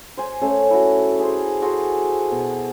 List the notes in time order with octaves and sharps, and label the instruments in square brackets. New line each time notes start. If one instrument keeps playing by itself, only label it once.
[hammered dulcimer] C5 G#5
A3 C#4 A4
E4 F#4
G#4 C5
F#4 G#4 A4 C5
B2